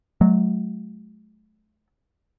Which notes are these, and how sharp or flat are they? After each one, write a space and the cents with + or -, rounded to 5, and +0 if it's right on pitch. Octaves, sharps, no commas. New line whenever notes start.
F#3 +0 A3 -40